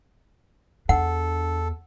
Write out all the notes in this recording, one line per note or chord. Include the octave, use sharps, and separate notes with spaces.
E2 D4 A4 F#5